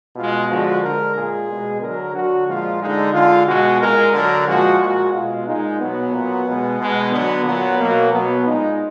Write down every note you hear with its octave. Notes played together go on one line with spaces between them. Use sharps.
B2 G#3 F4
D3 F3 G#3 F#4
D3 G#3 A#4
A#2 G#3 G#4
B2 G#3
D3 F#3 A#4
D3 F#3 F#4
A#2 F3 G#3 F4
D3 G#3 D#4
D3 G#3 F4
B2 G#3 F#4
A#2 G#3 A#4
D3 F#3 A#4
A#2 F3 G#3 F#4
A#2 G#3 F#4
B2 G#3 F4
A#2 G#3 D#4
B2 F#3 B3
A#2 F#3
B2 G#3
B2 G#3
D3 F#3 B3
A#2 F#3 B3
B2 F#3 A#3
B2 F#3 B3
A#2 G#3 D#4